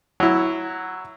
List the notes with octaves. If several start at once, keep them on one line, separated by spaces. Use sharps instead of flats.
F#3 E4